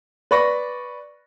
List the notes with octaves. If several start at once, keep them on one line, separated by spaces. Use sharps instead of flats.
B4 D5 B5 C#6 A#6